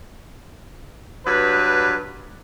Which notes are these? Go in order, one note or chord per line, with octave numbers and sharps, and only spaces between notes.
G2 F#3 B4